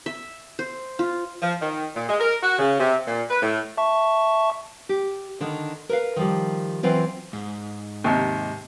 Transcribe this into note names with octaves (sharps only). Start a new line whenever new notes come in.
E5
C5
F4
F3
D#3
A#2
G#3
A#4
F#4
C#3
C3
A#2
B4
A2
E5 A5 C#6
G4
D3 D#3 D#4
A#4 B4 F5
D#3 F3 G3
E3 F#3 C4 F4
G#2
D#2 C3